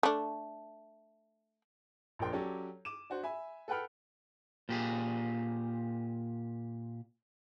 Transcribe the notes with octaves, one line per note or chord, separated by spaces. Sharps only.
A3 D4
A#1 F2 D4 A#4 G5 C6
F#3 C#4 G4 A4 C#5 D5
D6 D#7 E7
D4 F#4 C5
E5 G#5 B5
A4 B4 F#5 G5 B5 F6
A#2 G4 G#4